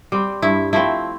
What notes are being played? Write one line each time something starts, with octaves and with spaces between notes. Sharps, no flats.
G3 C4
G2 E4
F3 A3 C4 E4